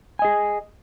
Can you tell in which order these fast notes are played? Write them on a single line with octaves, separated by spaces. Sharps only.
G#5 D#5 G#4